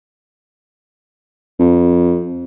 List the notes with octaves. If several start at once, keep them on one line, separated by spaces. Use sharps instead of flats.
F2